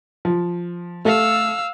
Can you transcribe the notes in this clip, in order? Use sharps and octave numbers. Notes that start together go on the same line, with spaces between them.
F3
A3 A4 F5 E6